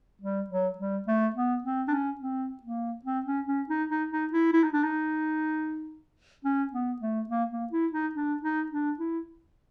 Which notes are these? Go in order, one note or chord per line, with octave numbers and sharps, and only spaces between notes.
G3
F#3
G3
A3
B3
C4
D4
C#4
C4
A#3
C4
C#4
C#4
D#4
D#4
D#4
E4
E4
D#4
D4
D#4
C#4
B3
A3
A#3
A#3
E4
D#4
D4
D#4
D4
E4